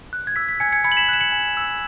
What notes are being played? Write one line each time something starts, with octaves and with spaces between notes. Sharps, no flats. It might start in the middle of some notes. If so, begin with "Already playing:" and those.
F#6
G#6
E6 B6
B6
G#5 G#6 C#7
G#6 C#7
B5 G#6 C#7
F#7
B6 E7
F#6 E7
C#7 F#7
G#5
E6